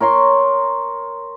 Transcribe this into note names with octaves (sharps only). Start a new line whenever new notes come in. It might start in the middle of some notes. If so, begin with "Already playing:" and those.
A#4 C#5 A#5 C6